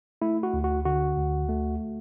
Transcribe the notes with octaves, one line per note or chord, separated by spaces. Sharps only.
A3 E4
F#4
D2
F#4
D3 F#4
D2
A3